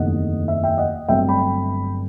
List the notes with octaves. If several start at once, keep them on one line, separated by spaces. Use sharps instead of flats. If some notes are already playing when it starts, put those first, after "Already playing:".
Already playing: F#1 E2 C3 D#3 A3 D#5 F#5
E5
E5 G5
D#5 F#5
G1 G2 F#3 A3 C4 E5 G5
G5 B5